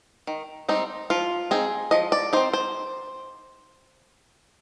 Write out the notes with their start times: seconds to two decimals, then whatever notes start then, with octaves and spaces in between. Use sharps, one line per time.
0.27 D#3
0.69 G3 C4 D#4
1.10 F3 F4
1.51 C4 D#4 G#4
1.91 F3 D#5
2.12 D5
2.33 C4 D#4 C5
2.53 C5